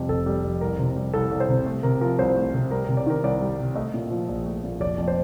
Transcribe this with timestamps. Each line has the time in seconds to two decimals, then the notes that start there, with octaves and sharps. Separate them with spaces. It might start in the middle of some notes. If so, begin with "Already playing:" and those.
Already playing: F2 C3 G3
0.09 F1 A4
0.26 G3
0.44 F2
0.61 C2 A#4
0.79 C3
0.96 G3
1.14 C2 A4
1.31 C2
1.40 C5
1.49 C3
1.66 A3
1.83 C3 A#4
2.01 F3 A#4
2.18 C2 C5
2.36 A3
2.54 C3
2.71 G3 A#4
2.85 C3 A#4
2.97 D5
3.06 D#3 A#4
3.23 C2 D5
3.41 G3
3.59 C3
3.75 A3 D#5
3.94 A#2
4.11 F3
4.28 A#1
4.46 A3
4.64 A#2
4.80 F1 D5
4.98 F2
5.08 C5